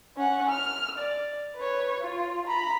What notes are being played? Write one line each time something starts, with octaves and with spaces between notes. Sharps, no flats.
C#4 F#5
F6
D5
B4 C#5
F4
A#5 B5